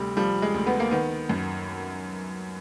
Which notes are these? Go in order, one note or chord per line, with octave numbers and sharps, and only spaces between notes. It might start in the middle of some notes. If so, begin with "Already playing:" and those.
Already playing: D2 C3 G3
F3 G3
G#3
D2
B3
A#3
D#3 B3
F#2